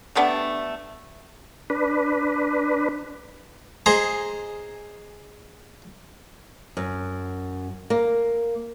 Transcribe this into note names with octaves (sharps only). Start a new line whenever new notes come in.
G3 A3 B3 D4
D4 B4
G#4 C5 D#5 A#5
F#2
A#3